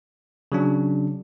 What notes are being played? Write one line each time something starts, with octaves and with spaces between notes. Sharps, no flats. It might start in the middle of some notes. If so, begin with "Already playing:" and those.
C#3 F#3 D4